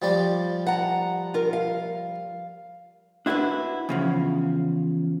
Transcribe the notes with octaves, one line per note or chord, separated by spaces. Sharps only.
F3 G3 D5
F#5 A#5
F4 A#4
F5
D4 E4 F#4 G#4 B4
E2 C#3 F3